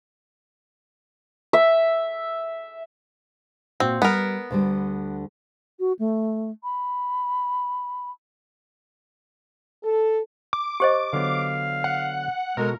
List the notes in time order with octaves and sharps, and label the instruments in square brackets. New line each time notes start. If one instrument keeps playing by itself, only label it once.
[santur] E5
[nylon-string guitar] A#2 F#4 [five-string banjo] C4
[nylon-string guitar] G3 [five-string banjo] B3 A#4
[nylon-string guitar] D2 D3 G3
[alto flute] F#4
A3
B5
[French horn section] A4
[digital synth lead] D6
[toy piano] G4 C5 D#5
[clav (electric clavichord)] D3 F#3 B3 [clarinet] F5
[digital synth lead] F#5
[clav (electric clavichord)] B2 F#4 A4 [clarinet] G#3 [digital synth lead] A#4